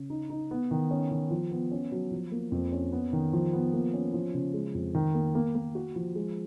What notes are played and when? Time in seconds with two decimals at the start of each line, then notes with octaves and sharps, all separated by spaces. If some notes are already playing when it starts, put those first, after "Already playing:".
Already playing: C#3
0.10 D#4
0.30 D#4
0.51 B3
0.71 D#3
0.91 C#4
1.11 D#3
1.31 F3
1.51 B3
1.71 C#4
1.92 F#3
2.11 F3
2.32 A#3
2.52 F2
2.72 C#4
2.92 B3
3.13 D#3
3.33 F3
3.53 B3
3.74 A#3
3.94 C#4
4.14 F3
4.34 C#3
4.54 G#3
4.74 F2
4.95 D#3
5.14 A#3
5.35 A#3
5.55 A#3
5.75 F#4
5.95 F3
6.15 G#3